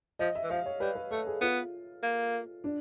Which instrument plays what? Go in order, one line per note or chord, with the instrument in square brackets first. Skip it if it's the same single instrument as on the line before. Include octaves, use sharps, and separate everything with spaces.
[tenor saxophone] F3 [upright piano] D#5
[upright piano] E5
[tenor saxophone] E3
[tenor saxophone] F3 [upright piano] F5
[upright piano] C#5
[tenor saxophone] G3 [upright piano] B4
[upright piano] B4
[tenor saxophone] A3 [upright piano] A4
[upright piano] G#4
[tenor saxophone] B3 [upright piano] F4
[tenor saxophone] A#3
[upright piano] D4